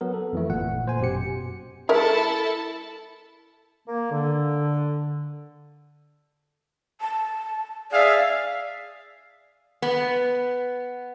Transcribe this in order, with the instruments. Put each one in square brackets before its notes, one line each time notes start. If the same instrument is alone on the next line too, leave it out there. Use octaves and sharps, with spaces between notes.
[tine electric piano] F#3 B3 A#4
A4
F2 E3 A3
G1 A#2 F#5
C5 G#5
F#2 B2 G4 C#7
[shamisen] G#3 A#4 E5 [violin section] E4 A4 A5
[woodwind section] A#3
D3
[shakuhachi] A5
[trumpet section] G#4 E5 F5 [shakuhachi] D5
[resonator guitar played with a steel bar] B3